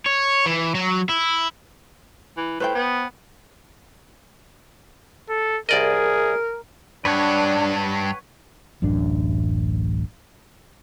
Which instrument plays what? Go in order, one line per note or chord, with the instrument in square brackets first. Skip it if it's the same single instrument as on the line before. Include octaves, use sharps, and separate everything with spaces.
[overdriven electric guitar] C#5
E3
F#3
E4
[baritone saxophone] E3
[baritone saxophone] A2 [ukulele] B4 C5 G5
[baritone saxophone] B3
[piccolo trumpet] A4
[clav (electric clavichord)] C2 D5 D#5 [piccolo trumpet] G#4 [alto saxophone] A#4
[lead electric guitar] G2 [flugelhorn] D4 [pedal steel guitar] B4 C#5 F#5
[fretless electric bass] D1 A1 F#2 D4